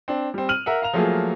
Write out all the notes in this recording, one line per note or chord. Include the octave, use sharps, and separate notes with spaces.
C4 D4
G3 C4
F6 D#7 F#7
A#4 E5 F#5
F5 A#5 F7
F3 F#3 A3 A#3 F4 G#4